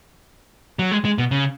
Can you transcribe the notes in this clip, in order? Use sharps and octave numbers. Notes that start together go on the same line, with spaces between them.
F#3
G#3
G#3
B2
C#3